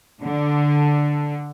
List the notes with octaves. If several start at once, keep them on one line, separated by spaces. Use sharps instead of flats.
D3